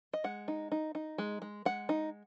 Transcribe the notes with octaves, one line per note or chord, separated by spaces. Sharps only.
D#5
G#3 F#5
D#4
D#4
D#4
G#3
G#3
G#3 F#5
D#4